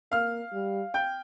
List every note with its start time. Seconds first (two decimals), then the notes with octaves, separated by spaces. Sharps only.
0.12 A#3 F5 F6
0.53 G3
0.94 G5 G6